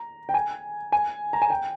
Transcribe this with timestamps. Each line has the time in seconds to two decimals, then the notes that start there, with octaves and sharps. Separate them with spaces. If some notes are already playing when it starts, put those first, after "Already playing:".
Already playing: A#5
0.29 G5
0.34 G#5
0.92 G#5
1.33 A#5
1.42 G#5
1.50 G5